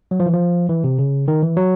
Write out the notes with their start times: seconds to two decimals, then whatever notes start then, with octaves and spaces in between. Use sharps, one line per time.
0.11 F#3
0.20 F3
0.26 E3
0.33 F3
0.69 E3
0.84 C3
0.99 C#3
1.28 D#3
1.43 E3
1.57 F#3